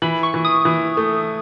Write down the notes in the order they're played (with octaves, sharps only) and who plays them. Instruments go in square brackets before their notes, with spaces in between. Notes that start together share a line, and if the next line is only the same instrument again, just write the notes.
[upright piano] E3 [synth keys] B5
[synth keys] C#6
[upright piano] E3
[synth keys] D#6
[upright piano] E3
A3